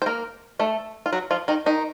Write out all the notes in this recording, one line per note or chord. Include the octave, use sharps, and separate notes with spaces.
C5
A#3 A#4
A3 A4
F4
F#3 F#4
F3 F4
D#3 D#4
D#3 D#4